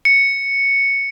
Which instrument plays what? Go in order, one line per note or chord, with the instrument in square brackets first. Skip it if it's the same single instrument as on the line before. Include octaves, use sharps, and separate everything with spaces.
[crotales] C#7